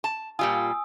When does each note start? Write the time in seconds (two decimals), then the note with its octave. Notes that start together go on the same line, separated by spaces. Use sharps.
0.04 A5
0.39 A#2 G3 F4 G#5 D#6 E6